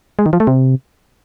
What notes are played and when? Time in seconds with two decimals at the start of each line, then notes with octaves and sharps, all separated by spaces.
0.19 G#3
0.26 D#3
0.33 F3
0.40 A3
0.47 C3